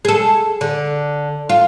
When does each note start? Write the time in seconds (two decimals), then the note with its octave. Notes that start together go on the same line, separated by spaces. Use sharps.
0.05 G#4 A4
0.61 D3
1.49 F4